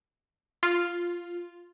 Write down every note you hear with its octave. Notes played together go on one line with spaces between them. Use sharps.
F4